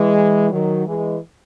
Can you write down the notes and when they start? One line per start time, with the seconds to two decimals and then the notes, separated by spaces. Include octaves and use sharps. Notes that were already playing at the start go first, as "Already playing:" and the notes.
Already playing: E3 G#3
0.51 D#3 F#3
0.86 E3 G#3